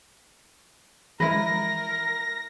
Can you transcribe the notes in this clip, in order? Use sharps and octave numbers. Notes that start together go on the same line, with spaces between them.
E3 F3 G#3 E4 A#4 B4 A#6